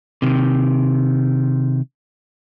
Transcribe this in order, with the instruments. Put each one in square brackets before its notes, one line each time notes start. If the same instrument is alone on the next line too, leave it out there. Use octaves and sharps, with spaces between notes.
[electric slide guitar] C3 D#3